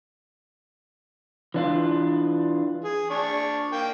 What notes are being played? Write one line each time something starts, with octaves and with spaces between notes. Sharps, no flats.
E3 D4 F4
G#4
D4 C#6
A#3 G5